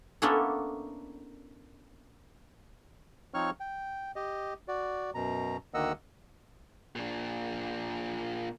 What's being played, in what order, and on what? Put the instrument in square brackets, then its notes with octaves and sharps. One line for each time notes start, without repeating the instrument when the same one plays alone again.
[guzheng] A#3 B3 C#4 D4 E4 A4
[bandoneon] F3 C4 D#4 C#5 C#6 F6
G5
G4 D#5
F#4 D5
F#2 B2 A#5
D2 D#3 A#3 D#5 F#5 E6
[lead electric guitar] A#2 D4